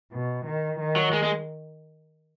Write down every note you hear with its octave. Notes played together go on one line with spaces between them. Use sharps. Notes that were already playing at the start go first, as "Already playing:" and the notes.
B2
D#3
D#3
F#3
G#3
G#3